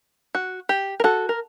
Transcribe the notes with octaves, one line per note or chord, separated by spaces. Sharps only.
F#4
G4
A#4
F#4 A4
A#4